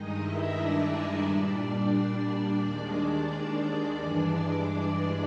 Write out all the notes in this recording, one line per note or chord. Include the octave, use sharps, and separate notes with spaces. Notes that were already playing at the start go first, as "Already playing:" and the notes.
Already playing: G2 D#3 G#3 D#4 D#5
E4 E5
D4 D5
A#2 G3
D4 D5
D#2 D#3 G#3 D4 D5
G2 E3 G#3